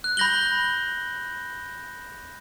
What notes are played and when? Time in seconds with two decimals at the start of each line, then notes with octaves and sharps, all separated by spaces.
0.04 F#6
0.17 B5 G6 A#6 F#7 G7